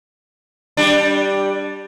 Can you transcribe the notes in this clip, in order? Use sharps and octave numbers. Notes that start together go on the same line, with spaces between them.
G3 D4